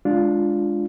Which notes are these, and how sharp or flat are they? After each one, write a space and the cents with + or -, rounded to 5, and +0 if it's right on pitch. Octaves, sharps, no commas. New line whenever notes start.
G#3 +0 D4 +0 F4 +0